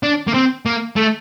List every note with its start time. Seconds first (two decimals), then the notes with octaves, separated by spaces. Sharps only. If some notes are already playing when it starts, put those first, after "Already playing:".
0.03 D4
0.27 A#3
0.34 C4
0.66 A#3
0.96 A3